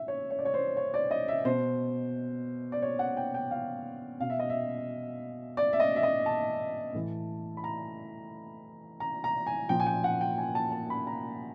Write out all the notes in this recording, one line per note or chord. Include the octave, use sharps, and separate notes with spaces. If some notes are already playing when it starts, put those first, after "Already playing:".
Already playing: E5
C#5
C#5
D5
C#5
C5
C#5
D5
D#5
E5
B2 C5
D5
C#5
F#5
G5
G5
F5
B2 F5
E5
D#5
E5
D5
E5
D#5
E5
D#5
A5
A2 E3
B5
A#5
A#5
A#5
G#5
A#2 F3 G5
G#5
G5
F#5
G5
G#5
A5
A5
B5
A#5